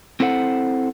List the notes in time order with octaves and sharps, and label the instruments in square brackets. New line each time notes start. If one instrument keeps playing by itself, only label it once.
[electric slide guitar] C4 E4 A4 C5 D5 F#5